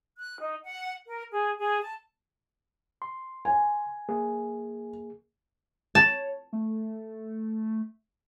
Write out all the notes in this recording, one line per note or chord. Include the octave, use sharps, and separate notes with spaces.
F#6
D#4
F#5
A#4
G#4
G#4
A5
C6
G#5
A#3 G#4
C#5 A5
A3